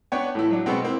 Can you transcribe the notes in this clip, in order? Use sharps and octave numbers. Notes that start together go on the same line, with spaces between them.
B3 D4 B4 C#5 G5
A2 E3 E4
F#3 D4
B2 G#3 B3 C4
A#3 C4 E4